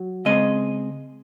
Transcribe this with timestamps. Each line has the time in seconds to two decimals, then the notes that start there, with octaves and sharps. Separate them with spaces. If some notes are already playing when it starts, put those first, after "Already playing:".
Already playing: F#3
0.25 C#3 G#3 C4 D#5